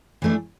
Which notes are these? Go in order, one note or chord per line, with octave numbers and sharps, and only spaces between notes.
E3 A3 D4